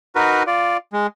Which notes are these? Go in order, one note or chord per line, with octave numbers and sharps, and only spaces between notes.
D#4 F#4 A#4 B4
F4 D5
G#3